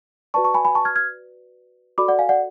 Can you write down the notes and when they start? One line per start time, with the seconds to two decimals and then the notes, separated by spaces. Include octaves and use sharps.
0.34 F#4 B4 D5 A5 C#6
0.44 A5 C#6
0.54 G#5 B5
0.65 G#5 B5
0.75 A5 C#6
0.85 F6 G#6
0.96 F6 G#6
1.98 F#4 A4 D5 B5 D6
2.08 D5 F#5
2.19 F5 G#5
2.29 D5 F#5